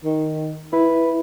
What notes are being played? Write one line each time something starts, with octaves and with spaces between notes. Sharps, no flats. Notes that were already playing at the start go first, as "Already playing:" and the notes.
D#3
E4 B4